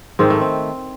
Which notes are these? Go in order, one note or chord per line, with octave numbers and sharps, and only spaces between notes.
G#2 D#3 G#3 C4
A3
C4